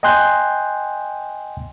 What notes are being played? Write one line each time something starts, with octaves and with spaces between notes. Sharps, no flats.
D#5 G5 G#5 C6 F#6 G6